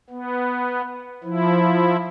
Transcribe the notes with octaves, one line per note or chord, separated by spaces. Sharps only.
B3
F3 E4